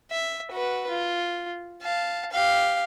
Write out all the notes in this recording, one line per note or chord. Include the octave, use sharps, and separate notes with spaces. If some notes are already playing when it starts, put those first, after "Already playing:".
E5
F#4 B4
F4
F5 A5
G4 F5